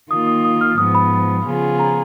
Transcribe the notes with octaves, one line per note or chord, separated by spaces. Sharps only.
D#3 A#3 F4 D#6
D#6
D#6
F6
G#2 F3 B3 D#6
B5
C#3 F3 B3 F4 G#4
A#5